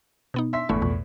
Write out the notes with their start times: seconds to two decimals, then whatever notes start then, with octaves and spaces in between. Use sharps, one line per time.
0.34 B2 B3 D#4
0.53 E5 C6 B6
0.69 G1 E2 A2 A3 E4 C#6
0.82 C2 F2 B2